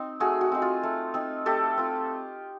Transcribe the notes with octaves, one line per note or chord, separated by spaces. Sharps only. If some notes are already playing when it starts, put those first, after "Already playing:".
Already playing: C4 D#4
A3 F#4 G#4
F#4
C4 D#4
F4
A3
C4 D#4
A3 G4 A4
C4 F4